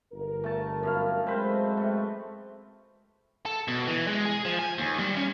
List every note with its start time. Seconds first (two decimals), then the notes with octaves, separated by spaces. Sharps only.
0.12 G1 A#4
0.44 A3 A5
0.83 F#2 E4 F5
1.26 G#3 C4 B4 C5
1.77 A3
3.46 A4
3.68 B2
3.87 E3
4.07 G#3
4.25 G#4
4.45 F3
4.59 G#5
4.78 D#2
4.99 G3
5.17 C#4